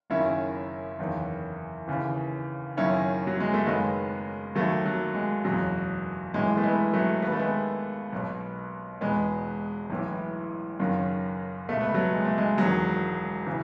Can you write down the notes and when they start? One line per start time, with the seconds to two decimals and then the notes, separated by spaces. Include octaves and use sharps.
0.10 F#1 F#2 D#3 C#4 E4
0.99 F#1 E2 D#3
1.88 D#2 C#3 E3
2.77 F#1 F#2 D#3 C#4 E4
3.27 F#3
3.40 G#3
3.54 A3
3.66 F#1 F#2 D#3 G#3 B3
4.55 D#2 D#3 F#3 A3
4.86 F#3
5.14 G#3
5.44 F#1 E2 B2 F#3
6.34 B1 A2 E3 G#3
6.57 A3
6.63 G#3 B3
6.93 F#3 A3
7.22 D#2 D#3 B3
7.32 A3
7.39 G#3 B3
8.13 B1 B2
9.01 E1 E2 B2 G#3 B3
9.90 B1 A2 E3
10.79 F#1 F#2 D#3
11.69 C#2 B2 A3
11.81 B3
11.94 F#3 A3
12.13 G#3
12.25 A3
12.38 G#3
12.58 E1 E2 D#3 F#3
13.46 C#3 E3